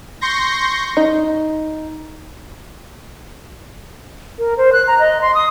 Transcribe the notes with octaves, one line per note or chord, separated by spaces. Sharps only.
C6 C#6 G6 A#6
D#4
A#4
C5
F#6
A#5
D#5
C6
D#6